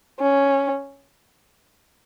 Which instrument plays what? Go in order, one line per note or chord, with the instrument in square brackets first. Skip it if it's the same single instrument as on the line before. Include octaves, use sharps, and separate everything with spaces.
[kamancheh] C#4